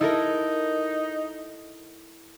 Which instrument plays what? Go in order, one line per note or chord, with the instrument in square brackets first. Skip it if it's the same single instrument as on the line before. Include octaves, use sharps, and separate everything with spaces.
[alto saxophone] D#4 [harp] E4 A4 A#4